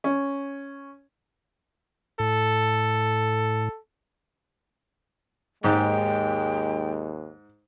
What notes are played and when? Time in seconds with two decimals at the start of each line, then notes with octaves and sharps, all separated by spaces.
0.04 C#4
2.20 A2 A4
5.64 D#2 G#2 G#3 G5